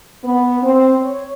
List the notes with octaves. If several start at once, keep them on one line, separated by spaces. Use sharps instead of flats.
B3
C4
C#5